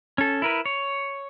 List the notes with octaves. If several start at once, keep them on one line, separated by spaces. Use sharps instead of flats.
C#4 A4
E4 A#4 B4
C#5